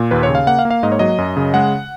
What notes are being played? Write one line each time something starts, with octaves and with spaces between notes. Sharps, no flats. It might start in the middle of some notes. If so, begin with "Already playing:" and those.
Already playing: A#2
D#2 B4
C#5
C#3
F5
A#3 F#5
F5
A#3
F5
G#2 D#5
C#5
F#3 D#5
F#2
C#3
G#3 F#5